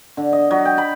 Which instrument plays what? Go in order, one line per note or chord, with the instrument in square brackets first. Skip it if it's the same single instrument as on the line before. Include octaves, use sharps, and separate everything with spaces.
[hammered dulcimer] D3
D#5
F#3
G5
B5